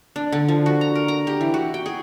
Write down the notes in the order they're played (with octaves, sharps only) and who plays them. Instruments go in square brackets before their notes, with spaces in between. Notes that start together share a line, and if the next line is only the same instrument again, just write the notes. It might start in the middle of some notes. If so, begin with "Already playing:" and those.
[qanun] D4
D3
F3
F#4
A#5
A#4
A#5
G4
E3
F#4
G5
G#4